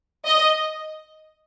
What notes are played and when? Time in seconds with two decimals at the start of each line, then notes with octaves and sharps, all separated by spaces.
0.26 D#5